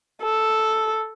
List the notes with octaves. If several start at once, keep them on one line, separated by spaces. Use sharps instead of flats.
A4